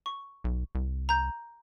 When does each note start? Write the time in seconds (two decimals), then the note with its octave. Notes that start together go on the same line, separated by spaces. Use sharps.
0.06 C#6
0.44 B1
0.75 C2
1.09 A#5 G6